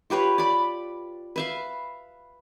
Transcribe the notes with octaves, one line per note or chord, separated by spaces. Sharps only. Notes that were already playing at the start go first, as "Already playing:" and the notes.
F4 G4 B4 C#5
D5 B5
B4 E5 F5